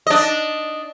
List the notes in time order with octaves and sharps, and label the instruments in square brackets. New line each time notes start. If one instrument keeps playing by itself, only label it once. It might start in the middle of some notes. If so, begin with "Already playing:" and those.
[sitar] D4 D#5